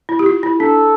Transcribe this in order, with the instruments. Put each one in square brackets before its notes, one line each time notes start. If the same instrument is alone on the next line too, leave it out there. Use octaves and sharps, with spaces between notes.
[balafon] E4
G4
F4
E4
[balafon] D4 [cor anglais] A4